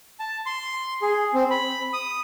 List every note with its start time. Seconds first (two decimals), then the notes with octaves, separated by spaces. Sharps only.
0.20 A5
0.46 C6
1.02 G#4
1.34 C4
1.50 B5
1.93 D#6